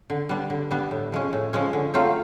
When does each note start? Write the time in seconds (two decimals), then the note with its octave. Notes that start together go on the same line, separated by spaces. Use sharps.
0.10 D3
0.29 G3 B3 D4
0.50 D3
0.71 G3 B3 D4
0.91 A2
1.12 F3 G#3 C#4
1.33 A2
1.53 F3 G#3 C#4
1.73 D3
1.94 F#3 A3 C4 F4